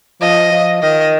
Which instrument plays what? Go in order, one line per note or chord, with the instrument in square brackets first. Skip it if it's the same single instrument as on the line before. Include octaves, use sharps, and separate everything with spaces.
[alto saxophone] F3 [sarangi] D#5
[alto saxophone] F3
[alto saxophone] D#3 [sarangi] D#5